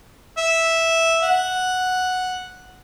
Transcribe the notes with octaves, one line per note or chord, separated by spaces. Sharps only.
E5
F#5